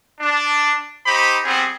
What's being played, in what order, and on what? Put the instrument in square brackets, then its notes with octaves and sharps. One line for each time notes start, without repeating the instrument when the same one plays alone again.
[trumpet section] D4
D#4 G4 C5 B5
G3 B3 C4 G#4